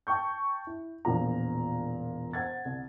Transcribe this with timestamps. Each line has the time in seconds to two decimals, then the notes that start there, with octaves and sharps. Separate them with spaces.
0.07 G5 A5 C#6 G6
0.67 E4
1.05 E1 A#2 F3 A#5
2.33 C5 F#5 G#6 A6
2.65 C2